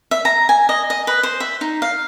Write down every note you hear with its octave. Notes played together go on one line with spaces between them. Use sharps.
E5
A#5
G#5
D#5
D#5
B4
C5
E5
D#4
F5